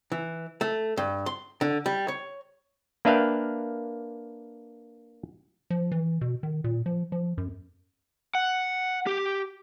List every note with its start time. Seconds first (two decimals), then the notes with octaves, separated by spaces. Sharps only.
0.12 E3
0.61 A3
0.97 G2
1.26 C6
1.61 D3
1.86 G3
2.08 C#5
3.05 A#3 D4 B4 E5 F5 G5
5.70 F3
5.92 E3
6.21 B2
6.43 D#3
6.64 A#2
6.86 F3
7.12 F3
7.37 F#2
8.35 F#5
9.07 G4